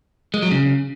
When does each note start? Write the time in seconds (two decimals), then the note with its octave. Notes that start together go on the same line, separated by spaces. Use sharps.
0.34 G#3
0.43 F#3
0.51 C#3